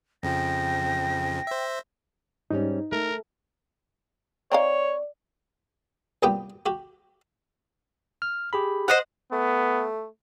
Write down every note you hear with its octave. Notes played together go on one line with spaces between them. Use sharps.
F2 C#3 F3 G5 A#6
C5 E5
G#2 G3 C#4 D#4
A3 A#4
C4 D#4 C#5 D5 F5
C2 A#2 B3 G4 G5 D#6
F#4 G4
F6
G4 G#4 B5
C5 D#5 F#5
A3 B3